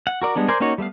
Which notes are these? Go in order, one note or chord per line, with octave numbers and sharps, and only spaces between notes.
F#5
F#4 A#4 D5
G3 G#3 B3 D4
A#4 C5 D5 F5 G#5
A#3 C#4 D#4 F#4 C#5
G3 A3 B3 F5